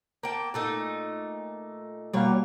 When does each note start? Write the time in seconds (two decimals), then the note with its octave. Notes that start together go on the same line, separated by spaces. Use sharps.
0.23 A#3 G5 A5
0.54 A#2 A3 D#4
2.13 B2 F#3 G3 A#3 C#5